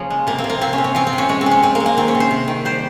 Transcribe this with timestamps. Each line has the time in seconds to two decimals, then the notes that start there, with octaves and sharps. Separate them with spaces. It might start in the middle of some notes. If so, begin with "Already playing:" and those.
Already playing: C#3 F3 A#3 C#4
0.10 G#3
0.27 C3 A#3
0.38 C4
0.44 C3
0.50 A#3
0.61 C3 C4
0.73 C#4
0.78 C3
0.84 C#4
0.95 F3 C4
1.07 C4
1.13 C3
1.18 C#4
1.29 G#3 C#4
1.41 C4
1.46 G#3
1.51 C#4
1.63 G#3 C4
1.75 A#3
1.80 G#3
1.86 A#3
1.97 D#3 C4
2.08 C#4
2.15 C3
2.20 C5
2.31 C3
2.48 D#3
2.65 G3 C5